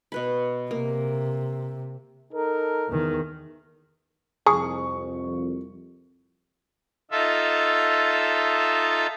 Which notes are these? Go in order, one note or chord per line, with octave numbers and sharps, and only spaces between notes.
B2 B4 B5
C3 A#3
D#4 A4 A#4
E2 D#3
C2 F2 G#4 C#6
D#4 F4 A4 E5